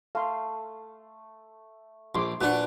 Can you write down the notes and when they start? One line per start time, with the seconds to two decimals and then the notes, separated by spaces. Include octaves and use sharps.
0.15 A3 F5 C6
2.15 A#1 C5 C6 D6
2.41 A#2 D4 F#4 B4 F#5